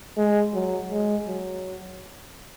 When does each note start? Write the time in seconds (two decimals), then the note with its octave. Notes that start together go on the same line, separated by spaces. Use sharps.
0.18 G#3
0.54 F#3
0.91 G#3
1.27 F#3